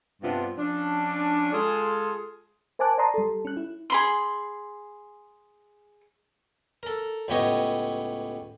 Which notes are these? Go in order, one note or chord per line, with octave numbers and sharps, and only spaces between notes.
G2 C3 B3 D4 F4
F3 C#4 D4
G#3 F4 G#4 A4
A#4 C5 G#5 A5 D6 F#6
D5 A5 A#5 C6 D#6
G3 A4
C#4 F#6
E4
G#4 B5 C6
A4 A#4
C#2 A2 B3 G4 C#5 D#5